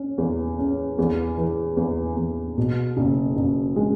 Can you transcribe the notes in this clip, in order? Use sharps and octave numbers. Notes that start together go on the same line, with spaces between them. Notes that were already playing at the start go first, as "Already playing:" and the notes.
Already playing: C#4
E2
C#4
E2
E3
E2
E2
B2
F#1
F#1
G#3